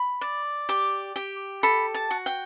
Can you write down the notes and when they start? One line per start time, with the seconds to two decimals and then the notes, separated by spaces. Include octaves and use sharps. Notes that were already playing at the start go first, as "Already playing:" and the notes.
Already playing: B5
0.21 D5
0.69 G4 D6
1.16 G4
1.63 A4 B5
1.94 A5
2.11 F#4
2.26 G5